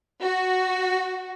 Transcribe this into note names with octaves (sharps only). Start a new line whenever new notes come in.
F#4